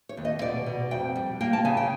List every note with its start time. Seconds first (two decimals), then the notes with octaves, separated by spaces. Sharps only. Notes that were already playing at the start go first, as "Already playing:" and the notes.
0.09 C#5
0.17 D#2
0.25 D#5
0.42 B2 D5
0.66 B2
0.91 F2 G5
1.16 G3
1.41 A#3 G5
1.53 A5
1.65 C#3 G#5
1.77 G5